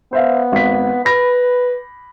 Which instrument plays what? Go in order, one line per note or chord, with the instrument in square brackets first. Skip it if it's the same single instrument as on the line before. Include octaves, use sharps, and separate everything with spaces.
[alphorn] B3 [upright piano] C5 E5 F5
[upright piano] G#1 B6
[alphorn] B4 [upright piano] B5 A#6